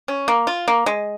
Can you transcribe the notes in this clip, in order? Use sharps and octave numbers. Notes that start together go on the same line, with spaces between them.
C#4
A#3
F4
A#3
G#3